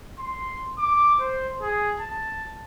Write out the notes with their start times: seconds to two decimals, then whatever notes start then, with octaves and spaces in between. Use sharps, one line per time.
0.19 C6
0.78 D6
1.20 C5
1.62 G#4
2.00 A5